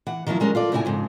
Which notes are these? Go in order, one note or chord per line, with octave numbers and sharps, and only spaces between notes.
E3 F#5
D#3 F3 F#3 A#3 E4
G3 G#3 C#4 A#4
F4 A4 D5
A2 C#3 B3 E4 F#4 G#5
F2 G#2 C#3